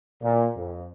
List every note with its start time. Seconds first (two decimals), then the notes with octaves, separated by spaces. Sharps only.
0.22 A#2
0.56 F2